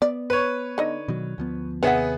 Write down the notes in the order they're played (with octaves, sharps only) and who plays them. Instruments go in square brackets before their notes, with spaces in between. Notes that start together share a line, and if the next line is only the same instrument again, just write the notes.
[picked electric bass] B3 [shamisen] D5
[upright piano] B4 C#5
[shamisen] D3 D#4 D#5
[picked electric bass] B2 D#3 F#3
D2 F3 B3
[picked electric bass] D#2 C3 [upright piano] B3 G#4 E5 [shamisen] C#5 F#5